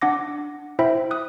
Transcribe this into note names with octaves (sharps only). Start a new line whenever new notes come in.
D4 F#5 D6 A#6
E4 C5 E5 G5 B5
D#6 F#6